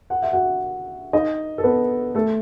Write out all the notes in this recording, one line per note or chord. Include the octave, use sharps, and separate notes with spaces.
F#5
E5
F#4 F#5
D#4 D#5
A4
B3 B4
A3 A4